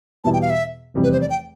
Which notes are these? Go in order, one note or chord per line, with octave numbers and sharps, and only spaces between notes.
E2 B2 G3 B3 E4 A5
G5
F5
E5
F1 E2 C3 G3 C4
B4
C5
D5
G5